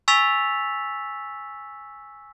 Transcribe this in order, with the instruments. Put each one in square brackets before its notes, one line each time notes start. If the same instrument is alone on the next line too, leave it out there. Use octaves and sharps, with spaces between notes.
[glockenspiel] G#5 C#6 E6 A6 B6 F7